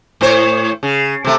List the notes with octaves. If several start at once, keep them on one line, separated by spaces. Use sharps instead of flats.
A2 C5 C#5
C#3
C3 A3